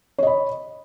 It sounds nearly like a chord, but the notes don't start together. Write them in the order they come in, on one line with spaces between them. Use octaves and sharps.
C#5 D#5 B5